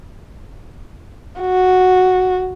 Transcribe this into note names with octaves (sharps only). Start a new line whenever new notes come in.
F#4